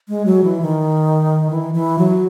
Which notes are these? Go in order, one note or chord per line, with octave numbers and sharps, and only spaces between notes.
G#3
F#3
E3
D#3
E3
E3
F#3